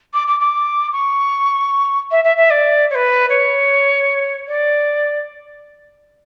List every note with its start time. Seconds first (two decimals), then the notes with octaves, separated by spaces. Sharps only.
0.14 D6
0.27 D6
0.40 D6
0.92 C#6
2.11 E5
2.24 E5
2.37 E5
2.50 D5
2.90 C#5
2.95 B4
3.30 C#5
4.47 D5